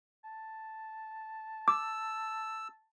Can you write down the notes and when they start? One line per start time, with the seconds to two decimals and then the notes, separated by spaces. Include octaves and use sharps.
0.24 A5
1.68 D6 E6